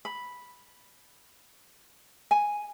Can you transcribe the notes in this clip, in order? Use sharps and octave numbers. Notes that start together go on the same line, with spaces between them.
B5
G#5